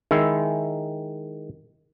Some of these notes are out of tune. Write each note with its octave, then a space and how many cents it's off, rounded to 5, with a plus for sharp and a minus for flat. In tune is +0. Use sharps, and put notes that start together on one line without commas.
D#3 +0 G#3 +0 E4 +0